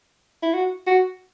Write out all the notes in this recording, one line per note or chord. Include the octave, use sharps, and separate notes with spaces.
E4
F#4
F#4